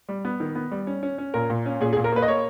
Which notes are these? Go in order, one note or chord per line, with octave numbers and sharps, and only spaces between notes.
G3
B3
D#3
B3
G3
C#4
C#4
C#4
A#2 A#4
A#2
C#4
A#2 G#4
G#4
A#2
A#4
A#3 B4
D#5
A#3 C#5